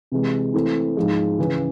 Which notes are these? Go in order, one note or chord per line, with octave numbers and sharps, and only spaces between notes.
C3 E3 G#3
E3 A3 C4 E4
G#2 F3 G#3
C#2 C#3 E3